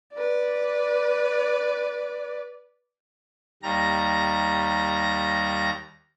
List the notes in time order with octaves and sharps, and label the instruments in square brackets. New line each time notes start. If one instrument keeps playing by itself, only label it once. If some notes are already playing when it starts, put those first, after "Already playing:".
[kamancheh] B4 D5
[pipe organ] D#2 G3 A#5 A#6